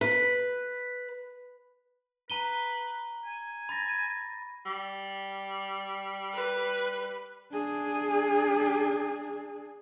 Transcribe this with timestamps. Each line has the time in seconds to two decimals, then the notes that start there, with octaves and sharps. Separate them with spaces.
0.01 B4
2.30 B4 A#5 D#7 G7
3.26 G#5
3.69 B5 A6 A#6
4.66 G3
6.33 B4
7.52 D4 G#4